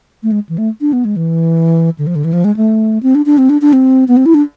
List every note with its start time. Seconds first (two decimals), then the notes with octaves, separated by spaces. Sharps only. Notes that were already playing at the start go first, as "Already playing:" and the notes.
0.23 A3
0.32 G#3
0.49 E3
0.58 A3
0.81 D4
0.93 B3
1.05 G#3
1.16 E3
1.99 D3
2.07 F3
2.16 D3
2.24 E3
2.33 F3
2.44 G#3
2.56 A3
3.03 C4
3.15 D4
3.26 D4
3.38 C4
3.50 D4
3.62 D4
3.73 C4
4.08 B3
4.17 C4
4.26 E4
4.34 D4